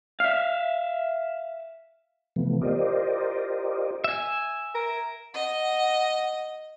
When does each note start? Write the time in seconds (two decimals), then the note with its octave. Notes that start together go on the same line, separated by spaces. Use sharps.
0.20 E5 F5
2.36 C3 E3 F3 A3 B3
2.61 F4 G4 A#4 C5 D5 D#5
4.04 E5 G#5
4.75 A#4
5.34 D#5 F#5